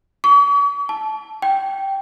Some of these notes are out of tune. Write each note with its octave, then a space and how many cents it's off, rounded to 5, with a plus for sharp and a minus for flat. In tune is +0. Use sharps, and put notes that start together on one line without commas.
C#6 +45
A5 -15
G5 -5